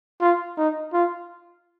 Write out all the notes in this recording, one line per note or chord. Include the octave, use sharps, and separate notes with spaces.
F4
D#4
F4